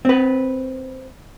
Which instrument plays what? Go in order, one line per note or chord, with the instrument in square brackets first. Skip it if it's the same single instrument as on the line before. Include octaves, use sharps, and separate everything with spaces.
[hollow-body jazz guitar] C4 B4